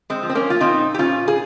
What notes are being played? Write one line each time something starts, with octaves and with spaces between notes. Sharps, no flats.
G#3 C4
F3
C4
A#3 C#4
F4
A#2 C4 D#4
G4
A#2 C#4 F4
G#4